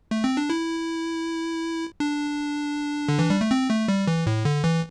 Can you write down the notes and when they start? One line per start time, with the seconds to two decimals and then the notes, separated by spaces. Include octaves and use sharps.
0.11 A3
0.24 C4
0.37 D4
0.50 E4
2.00 D4
3.09 D3
3.19 E3
3.30 G3
3.41 A3
3.51 C4
3.70 A3
3.88 G3
4.07 E3
4.27 A2
4.45 D3
4.64 E3